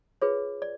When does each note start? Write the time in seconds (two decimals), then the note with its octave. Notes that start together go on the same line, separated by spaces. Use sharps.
0.22 F4 G#4 B4 C#5
0.62 D5